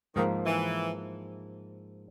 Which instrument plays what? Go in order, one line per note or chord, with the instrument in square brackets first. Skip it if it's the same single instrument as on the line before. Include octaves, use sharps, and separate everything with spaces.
[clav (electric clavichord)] G#2 F3 A#3 [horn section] D#3
[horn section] E3